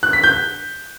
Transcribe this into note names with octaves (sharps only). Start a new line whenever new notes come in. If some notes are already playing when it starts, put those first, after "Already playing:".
F#6
B6
G6